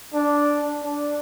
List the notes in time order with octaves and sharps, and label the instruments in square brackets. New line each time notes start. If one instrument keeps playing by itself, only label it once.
[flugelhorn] D4
D4